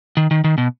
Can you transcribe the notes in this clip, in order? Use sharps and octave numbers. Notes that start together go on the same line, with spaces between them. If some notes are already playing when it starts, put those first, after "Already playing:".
D#3
D#3
D#3
B2